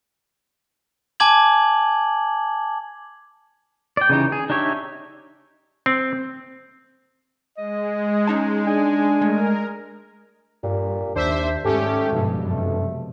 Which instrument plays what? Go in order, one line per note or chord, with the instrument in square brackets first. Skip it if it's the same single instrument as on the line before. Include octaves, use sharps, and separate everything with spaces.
[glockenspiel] G#5 A5 D6 G#6 F#7
[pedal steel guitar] D5 G5
C#3 E3 D#4 G4
G#4
D4 D#4 G4 C#5 E5
[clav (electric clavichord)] C4
[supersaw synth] G#3 [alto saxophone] D#5
[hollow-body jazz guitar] C#4 D#4 A5
[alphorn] D4 [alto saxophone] G#5
[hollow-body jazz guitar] G#3 A3 [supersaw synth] A#4
[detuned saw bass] G2 [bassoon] A#2 [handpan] G4
[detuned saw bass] D#2 [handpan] D#3 [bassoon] D4 [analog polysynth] C5 E5
[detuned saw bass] G#2 [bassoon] A3 [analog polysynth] C#4 G4 [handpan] A4
[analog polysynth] G2 [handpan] B2 F3 G#3
[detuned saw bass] F#2
[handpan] C3 [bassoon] A3